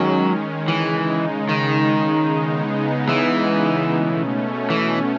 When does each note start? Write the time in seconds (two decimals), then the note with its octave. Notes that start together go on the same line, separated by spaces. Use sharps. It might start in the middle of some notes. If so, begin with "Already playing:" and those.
Already playing: D#3 F#3 G#3 C#4
0.68 C#3 E3 G#3 D#4
1.49 D#3
2.29 C#3 G#3 B3 D#4
3.09 E3
3.90 B2 A3 C#4
4.70 E3